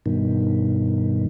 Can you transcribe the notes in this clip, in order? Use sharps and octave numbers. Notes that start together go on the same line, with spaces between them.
G2 B2 D#3